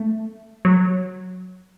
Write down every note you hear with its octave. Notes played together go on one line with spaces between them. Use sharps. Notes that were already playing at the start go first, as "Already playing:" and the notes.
Already playing: A3
F#3